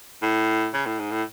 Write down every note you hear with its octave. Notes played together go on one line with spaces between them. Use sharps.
A2
C#3
A2
G#2
A2